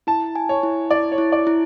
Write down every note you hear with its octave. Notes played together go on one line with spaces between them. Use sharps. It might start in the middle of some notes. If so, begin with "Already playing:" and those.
E4 A5
G#5
C#5
E4
E4 D5
C#5
E4
D5
E4